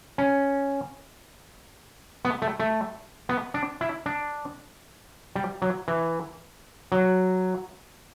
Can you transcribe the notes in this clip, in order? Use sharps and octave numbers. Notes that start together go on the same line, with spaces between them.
C#4
B3
A3
A3
B3
D4
E4
D4
G3
F#3
E3
F#3